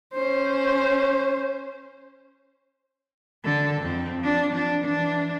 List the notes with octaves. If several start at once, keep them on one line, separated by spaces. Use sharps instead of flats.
C#4 C5
D3 A4
F2 C4
F3 D4
F3 D4
E3 D4